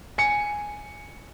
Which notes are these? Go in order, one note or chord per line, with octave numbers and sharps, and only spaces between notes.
G#5 C#7